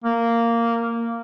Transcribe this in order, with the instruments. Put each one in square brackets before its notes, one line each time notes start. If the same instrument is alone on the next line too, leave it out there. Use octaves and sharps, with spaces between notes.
[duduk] A#3